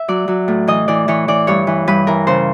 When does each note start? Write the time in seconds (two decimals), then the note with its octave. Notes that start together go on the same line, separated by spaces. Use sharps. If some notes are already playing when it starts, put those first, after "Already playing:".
Already playing: E5
0.08 F#3 D5
0.28 F#3
0.48 A2
0.67 E3 D#5
0.88 E3 D5
1.08 E3 C#5
1.28 E3 D5
1.47 G2 C#5
1.67 E3
1.87 G2 B4
2.07 E3 A#4
2.27 C#3 C5